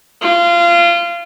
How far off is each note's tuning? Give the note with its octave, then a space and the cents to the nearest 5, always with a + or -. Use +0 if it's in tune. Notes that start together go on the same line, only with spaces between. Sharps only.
F4 -25